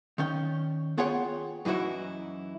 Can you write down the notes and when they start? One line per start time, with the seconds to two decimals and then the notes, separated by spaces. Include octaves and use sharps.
0.18 D#3 C#4 G5
0.98 B3 F4 G#4 C#5 F#5 G5
1.65 F#2 E3 D#4 E4 F#4